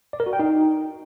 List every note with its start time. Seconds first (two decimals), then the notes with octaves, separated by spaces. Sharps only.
0.13 D5
0.20 A#4
0.26 F#4
0.33 G5
0.39 D#4